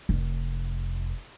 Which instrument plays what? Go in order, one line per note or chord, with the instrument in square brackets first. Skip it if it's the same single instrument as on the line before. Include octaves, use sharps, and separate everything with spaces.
[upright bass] F1